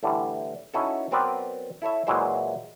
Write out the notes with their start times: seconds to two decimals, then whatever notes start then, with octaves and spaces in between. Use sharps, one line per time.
0.03 A2 D3 E3 G3
0.74 C#4 D#4 E4 F#4 A4
1.11 F#3 B3 C4 A#4 B4 D5
1.82 E4 A4 C#5 E5
2.07 A#2 E3 F#3 G#3 E4 C5